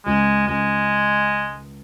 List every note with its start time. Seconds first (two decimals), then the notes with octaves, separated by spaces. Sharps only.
0.06 C#2 G#3
0.47 C#2 G#3